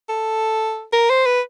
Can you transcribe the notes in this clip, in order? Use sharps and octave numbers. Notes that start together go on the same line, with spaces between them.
A4
A#4
C5
B4